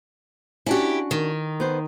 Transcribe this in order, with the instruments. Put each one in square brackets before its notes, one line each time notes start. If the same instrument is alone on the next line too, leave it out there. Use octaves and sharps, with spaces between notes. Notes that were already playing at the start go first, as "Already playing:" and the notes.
[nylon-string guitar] C#4 D4 F#4 [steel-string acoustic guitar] E4 G4
[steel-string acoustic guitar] D#3
[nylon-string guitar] B3 C5